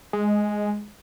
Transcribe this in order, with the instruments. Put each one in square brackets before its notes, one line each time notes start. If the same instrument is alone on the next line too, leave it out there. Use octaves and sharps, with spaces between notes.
[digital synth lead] G#3